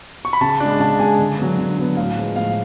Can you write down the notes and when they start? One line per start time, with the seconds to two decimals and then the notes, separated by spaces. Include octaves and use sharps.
0.25 C#6
0.33 B5
0.41 C#3 A5
0.60 G#3 D4
0.80 C#3 A5
0.99 G#3 D4 G#5
1.19 D3
1.38 F#3 B3
1.58 D3
1.78 F#3 B3
1.97 A2 F5
2.17 F3 G#3
2.36 A2 F5